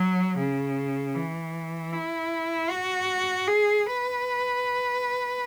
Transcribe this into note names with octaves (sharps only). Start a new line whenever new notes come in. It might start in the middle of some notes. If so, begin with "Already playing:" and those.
Already playing: F#3
C#3
E3
E4
F#4
G#4
B4